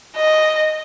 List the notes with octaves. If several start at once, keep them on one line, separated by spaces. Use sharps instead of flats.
D#5